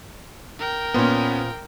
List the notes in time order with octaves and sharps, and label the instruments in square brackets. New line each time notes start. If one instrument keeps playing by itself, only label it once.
[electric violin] A#4 G5
[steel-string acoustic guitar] A#2 C5 [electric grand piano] B3 C#4